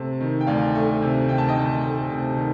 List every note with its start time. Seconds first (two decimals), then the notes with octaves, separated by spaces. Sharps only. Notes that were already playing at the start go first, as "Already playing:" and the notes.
Already playing: C3 A3 A5
0.21 D#3
0.41 G5
0.47 D2 D5 F5
0.75 A3
1.02 C3
1.29 D#3 G5
1.38 A5
1.49 D#5 G5
1.56 D2
1.83 A3
2.11 C3
2.37 D#3